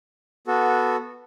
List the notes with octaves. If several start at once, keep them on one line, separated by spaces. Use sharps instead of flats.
B3 F#4 A4